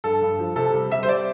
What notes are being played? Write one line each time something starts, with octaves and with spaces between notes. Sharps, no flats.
G2 A4
G2
F3
C3 A4
G3
G3 E5
C5
C4 D5